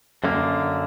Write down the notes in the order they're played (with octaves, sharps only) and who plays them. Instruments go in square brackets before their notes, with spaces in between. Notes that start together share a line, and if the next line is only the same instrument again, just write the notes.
[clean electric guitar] F#2 D3 A#3